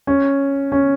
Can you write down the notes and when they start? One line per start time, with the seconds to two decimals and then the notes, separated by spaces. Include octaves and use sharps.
0.07 C#4
0.72 C#4